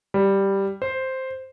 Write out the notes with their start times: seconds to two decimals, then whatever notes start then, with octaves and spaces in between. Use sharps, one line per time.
0.14 G3
0.82 C5